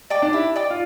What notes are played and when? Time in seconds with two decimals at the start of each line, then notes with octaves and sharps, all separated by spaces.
0.10 D5 G5 D6
0.22 D4
0.33 E4 G4
0.56 D5 G5 D6
0.70 F4